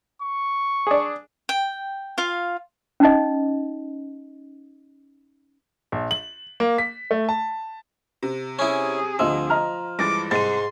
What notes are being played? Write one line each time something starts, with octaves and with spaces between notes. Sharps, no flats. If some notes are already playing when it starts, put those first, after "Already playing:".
C#6
D4 G#4
G5
F4 F5
C#4 D#4 D#5
A#1
F#7
A#3
B6
A3
A5
C3
C#4 E4 G#4
D2 F3 D#5 E6
D#5 A#5 F6
G2 E3 G#3 D6 A6 A#6
C2 G#2 C6 A6 D#7